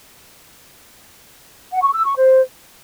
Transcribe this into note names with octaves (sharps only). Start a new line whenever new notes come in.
F#5
C#6
E6
C#6
C5